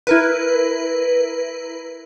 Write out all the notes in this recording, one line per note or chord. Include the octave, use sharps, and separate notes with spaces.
E4 A#4 B4